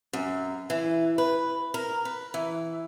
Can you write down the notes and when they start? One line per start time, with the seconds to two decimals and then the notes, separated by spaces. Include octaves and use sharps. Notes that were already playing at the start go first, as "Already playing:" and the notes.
0.13 F#2
0.70 E3
1.18 B4
1.74 A#4
2.05 B4
2.34 E3